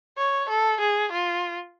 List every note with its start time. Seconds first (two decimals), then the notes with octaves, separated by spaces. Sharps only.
0.17 C#5
0.49 A4
0.80 G#4
1.12 F4